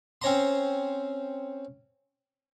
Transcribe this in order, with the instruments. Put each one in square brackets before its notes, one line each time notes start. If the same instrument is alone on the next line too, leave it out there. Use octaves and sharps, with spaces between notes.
[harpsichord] C4 C#4 C#5 A#5 C6